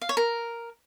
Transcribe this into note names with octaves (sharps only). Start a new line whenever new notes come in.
F5
C#5
A#4